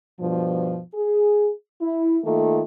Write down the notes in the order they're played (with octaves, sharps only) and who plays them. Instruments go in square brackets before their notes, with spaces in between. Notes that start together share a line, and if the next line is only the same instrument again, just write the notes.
[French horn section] G2 B2 F3
G#4
E4
D#3 A3 A#3 F4 A4